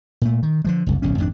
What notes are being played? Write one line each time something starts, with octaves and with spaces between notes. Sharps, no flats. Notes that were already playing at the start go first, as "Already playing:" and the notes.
A#2 A3
D#3
D3 F3 G#3
F#1 C2
D1 B1 D3 C#4
G#1 F2 C#4 D4